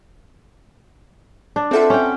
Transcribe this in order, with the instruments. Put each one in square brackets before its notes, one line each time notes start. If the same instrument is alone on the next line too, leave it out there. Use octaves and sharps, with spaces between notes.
[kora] D4
[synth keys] C4 E5 F#5 [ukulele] F4 A4 C5
[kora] C#4 G5